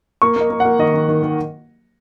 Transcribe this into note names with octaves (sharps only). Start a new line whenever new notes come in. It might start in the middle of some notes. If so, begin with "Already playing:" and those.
A#3 C#6
A#3 D#5
A#3
F#5
A#3
D#3 D#5
D#3
D#3
D#3